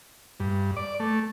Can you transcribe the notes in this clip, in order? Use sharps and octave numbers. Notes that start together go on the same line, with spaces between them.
G2
D5
A3